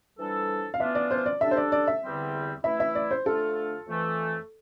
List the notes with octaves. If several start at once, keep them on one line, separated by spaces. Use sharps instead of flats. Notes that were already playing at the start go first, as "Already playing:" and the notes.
F2 E3 G3 D4 A4
F5
E3 B3 D4 F4 E5
D5
C5
D5
G3 D4 A4 E5
C5
D5
D5
E5
E2 D3 G3 C4
E3 A3 E4 E5
E5
D5
C5
F2 D3 A3 D4 F4 A4
F2 E3 A3